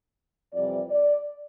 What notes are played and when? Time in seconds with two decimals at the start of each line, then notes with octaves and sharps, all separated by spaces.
0.53 F2 C3 E3 G3 D5
0.89 D5